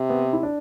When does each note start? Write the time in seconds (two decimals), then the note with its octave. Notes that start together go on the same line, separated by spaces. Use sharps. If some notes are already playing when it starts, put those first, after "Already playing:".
Already playing: C3
0.10 B3
0.33 E4
0.43 D4